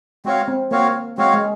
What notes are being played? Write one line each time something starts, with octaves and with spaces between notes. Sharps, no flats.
G#3 C4 F#4 C#5 F5
C4
A#3 C4 F#4 C#5 F5
G#3 C4 F#4 C#5 F5
G#3